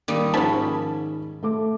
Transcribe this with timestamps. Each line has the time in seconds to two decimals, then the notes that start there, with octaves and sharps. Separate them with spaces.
0.08 D#3 G3 A#3 D#4
0.34 G#2 D#3 F3 C#4 A5 B5
1.43 A3 A4 D6